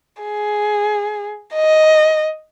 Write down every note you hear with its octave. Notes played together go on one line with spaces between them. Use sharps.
G#4
D#5